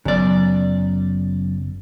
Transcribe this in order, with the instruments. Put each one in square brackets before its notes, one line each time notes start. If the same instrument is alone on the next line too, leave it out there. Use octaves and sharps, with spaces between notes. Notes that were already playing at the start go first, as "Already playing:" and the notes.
[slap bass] F#1 B3 [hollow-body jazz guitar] F#2 D5